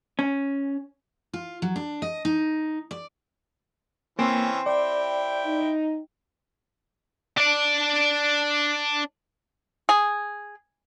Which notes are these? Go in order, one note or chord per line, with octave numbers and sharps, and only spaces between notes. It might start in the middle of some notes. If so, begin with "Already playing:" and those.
C#4
F4
F#3
D4
D#5
D#4
D5
E3 A#3 C4 C#4
E4 G4 D5 G5
D#4
D4 D5
G#4